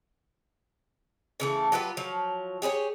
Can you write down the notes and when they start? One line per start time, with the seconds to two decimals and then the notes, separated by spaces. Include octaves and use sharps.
1.40 C#3 E3 A3
1.72 F#3 F4 G4 B4
1.97 F3 F#3
2.62 G4 G#4 B4 C#5